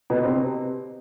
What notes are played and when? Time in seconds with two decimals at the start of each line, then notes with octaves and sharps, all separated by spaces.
0.10 B2 B3
0.25 C3 C4